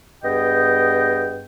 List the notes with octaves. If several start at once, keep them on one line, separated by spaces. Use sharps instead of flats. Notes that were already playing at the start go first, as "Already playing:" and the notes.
G2 B3 G#4 D#5 G5